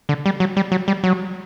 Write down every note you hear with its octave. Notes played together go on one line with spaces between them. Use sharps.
D3
G3
F#3
G3
F#3
G3
F#3